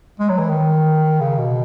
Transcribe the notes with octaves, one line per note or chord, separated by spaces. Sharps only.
G#3
F#3
E3
D#3
C#3
B2